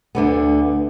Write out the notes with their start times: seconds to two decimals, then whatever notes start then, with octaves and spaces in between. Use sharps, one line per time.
0.15 D2 D3 B3